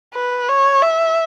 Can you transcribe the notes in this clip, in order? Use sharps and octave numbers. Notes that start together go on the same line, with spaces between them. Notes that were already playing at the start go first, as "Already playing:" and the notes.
B4
C#5
E5